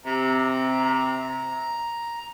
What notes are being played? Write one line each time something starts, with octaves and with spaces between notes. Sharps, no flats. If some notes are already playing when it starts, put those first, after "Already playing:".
C3 A#5